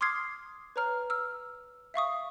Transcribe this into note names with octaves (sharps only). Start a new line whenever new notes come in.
C6 D6 D#6 F6 G#6 C7
B4 C#5 A#5 F6
E6 F6
E5 F5 C#6 D#6